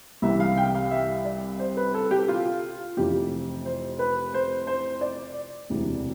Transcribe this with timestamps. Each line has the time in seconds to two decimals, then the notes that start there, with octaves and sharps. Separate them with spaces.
0.22 C2 C3 E3 E5
0.40 F5
0.57 G5
0.75 F5
0.91 E5
1.25 D5
1.59 C5
1.77 B4
1.94 A4
2.11 G4
2.28 F4
2.97 F1 F2 C3 E3 G4
3.65 C5
3.99 B4
4.34 C5
4.67 C5
5.01 D5
5.70 E1 D2 C3 E3